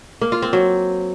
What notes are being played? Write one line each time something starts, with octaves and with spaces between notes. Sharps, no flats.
A#3
F4
C4
F#3